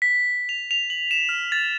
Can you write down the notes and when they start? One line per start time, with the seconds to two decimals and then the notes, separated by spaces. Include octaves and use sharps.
0.02 B6
0.49 F7
0.71 F7
0.90 F#7
1.11 E7
1.29 F6
1.52 A6